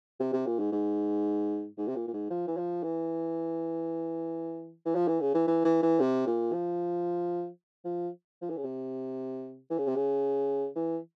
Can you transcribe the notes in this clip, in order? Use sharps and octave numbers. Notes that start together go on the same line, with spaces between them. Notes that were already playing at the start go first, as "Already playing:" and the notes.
C3
C3
A#2
G#2
G#2
G#2
C3
A#2
A#2
G#2
F3
E3
F3
E3
E3
F3
E3
C#3
E3
E3
E3
E3
C3
A#2
F3
F3
F3
E3
C#3
C3
E3
C#3
C3
C#3
E3